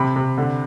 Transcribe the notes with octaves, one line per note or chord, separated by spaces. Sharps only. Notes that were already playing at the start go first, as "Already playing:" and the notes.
Already playing: C3 B5
C3
D3